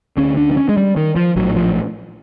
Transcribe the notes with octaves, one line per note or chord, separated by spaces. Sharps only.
D2 D3 C#4
D4
D4
C#4
G#3
G3
D#3
F3
A#1 A2 F#3
F3